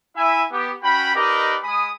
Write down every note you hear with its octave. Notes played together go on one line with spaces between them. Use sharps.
E4 E5 G#5
B3 G4
C#4 F#4 G5 B5
D#4 G4 A#4 B4 D5 D#5
G#3 G#5 B5 D#6